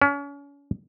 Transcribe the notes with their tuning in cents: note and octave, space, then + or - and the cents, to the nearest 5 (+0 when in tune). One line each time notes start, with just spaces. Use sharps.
C#4 +35